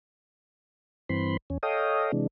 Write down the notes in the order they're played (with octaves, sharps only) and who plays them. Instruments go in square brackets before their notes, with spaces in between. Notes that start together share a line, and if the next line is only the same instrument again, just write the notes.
[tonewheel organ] G2 E3 C4 B5 C6
E2 C#4
A4 C#5 D#5 F5 G5 D#6
C3 E3 G#3 D4